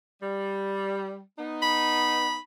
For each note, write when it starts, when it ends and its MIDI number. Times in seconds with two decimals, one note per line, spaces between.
0.22 1.20 55
1.38 2.37 59
1.38 2.37 63
1.62 2.38 83